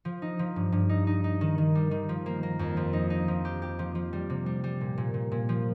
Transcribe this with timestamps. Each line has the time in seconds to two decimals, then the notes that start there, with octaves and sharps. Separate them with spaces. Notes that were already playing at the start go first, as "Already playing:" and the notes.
0.05 F3
0.22 D#4
0.39 F3
0.56 G2
0.72 G2
0.89 D#4
1.07 D#4
1.24 D#4
1.41 D#3
1.58 D#3
1.75 G3
1.91 D#3
2.09 F3
2.26 A#3
2.43 A#3
2.59 F2
2.77 F3
2.93 D#4
3.10 D#4
3.28 F3
3.45 G4
3.62 G4
3.79 F3
3.95 F3
4.13 G3
4.30 C3
4.46 G3
4.64 G3
4.81 A#2
4.98 A#2
5.14 A#2
5.32 A#2
5.49 F3